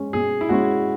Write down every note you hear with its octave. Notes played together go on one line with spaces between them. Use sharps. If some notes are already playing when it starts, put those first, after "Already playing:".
Already playing: G#3 C#4
B2 G#4
E4
G#3 C#4 F#4